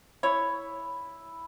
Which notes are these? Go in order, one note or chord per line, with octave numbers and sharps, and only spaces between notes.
E4 C#5